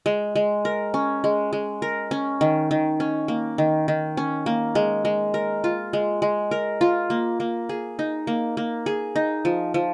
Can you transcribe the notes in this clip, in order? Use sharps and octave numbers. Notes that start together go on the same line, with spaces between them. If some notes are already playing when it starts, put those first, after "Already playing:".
G#3
G#3
A#4
C#4
G#3
G#3
A#4
C#4
D#3
D#3
C#4
A#3
D#3
D#3
C#4
A#3
G#3
G#3
A#4
F4
G#3
G#3
A#4
F4
A#3
A#3
G#4
D#4
A#3
A#3
G#4
D#4
F3
F3